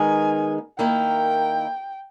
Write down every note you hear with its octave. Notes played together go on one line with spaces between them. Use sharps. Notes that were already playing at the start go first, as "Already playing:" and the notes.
Already playing: D#3 G#3 B3 D#4 G#5
D#3 A#3 E4 G5